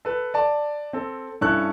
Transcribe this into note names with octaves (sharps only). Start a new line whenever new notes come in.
A4 B4
D5 A5
C4 A4
G2 C#4 E4 A4 E6 F#6